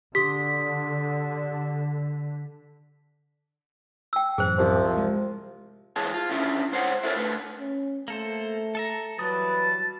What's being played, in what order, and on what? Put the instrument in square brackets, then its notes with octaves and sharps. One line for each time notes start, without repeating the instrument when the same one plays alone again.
[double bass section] D3 [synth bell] G4 C6 D#6 [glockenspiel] B6
[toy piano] G5 E6
[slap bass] F#2 A2 E3 [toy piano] G#4 C5
[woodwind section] C2 C3 F3
[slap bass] G#3
[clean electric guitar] G#2 E3 G#4 C#5 A5
F4
D3 D#3 C#4 E4
C#2 G#2 C5 C#5 F#5
E4 F#4 A4 A#4 C5 C#5
D3 A3 B4
[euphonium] C#4
[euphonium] A3 [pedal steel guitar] A#3 A4 C5
[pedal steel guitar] A4 E5 A#5
[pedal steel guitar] E3 G3 D#6 [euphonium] F#3 [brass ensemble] B4 [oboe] A5